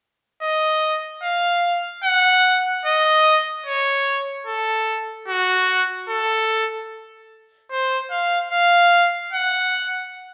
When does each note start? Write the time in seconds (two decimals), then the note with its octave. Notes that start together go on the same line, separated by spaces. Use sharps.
0.42 D#5
1.23 F5
2.04 F#5
2.86 D#5
3.66 C#5
4.47 A4
5.28 F#4
6.09 A4
7.71 C5
8.11 F5
8.52 F5
9.33 F#5